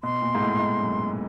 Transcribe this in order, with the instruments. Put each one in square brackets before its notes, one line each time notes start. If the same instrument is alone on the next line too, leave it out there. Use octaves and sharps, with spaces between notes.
[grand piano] B2 [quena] C6
[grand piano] A#2
G#2
A2
G#2
F#2